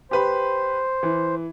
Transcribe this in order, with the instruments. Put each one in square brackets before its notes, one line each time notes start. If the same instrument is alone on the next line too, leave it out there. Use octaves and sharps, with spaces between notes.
[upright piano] G4 B4 B5 [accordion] C5
[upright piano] E3